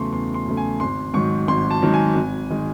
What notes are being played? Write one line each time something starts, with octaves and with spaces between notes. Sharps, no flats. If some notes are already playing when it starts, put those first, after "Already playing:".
Already playing: E2 C#3 F#3 A3 C6 C#6
E2 C6
C6
C#3 F#3 A3
G#5
G#1 C6
G#2 D#3 F#3 C#6
G#1 C6
A5
G#2 D#3 F#3
G#5
G#1
D#3 G#3